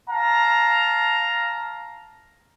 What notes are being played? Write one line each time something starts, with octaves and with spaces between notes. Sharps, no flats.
F5 A5 A#5